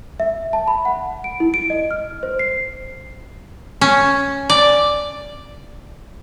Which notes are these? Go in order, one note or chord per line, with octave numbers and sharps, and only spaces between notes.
E5
A5
B5
F#5
D7
E4
D7
D#5
F6
C5
C7
C#4
D5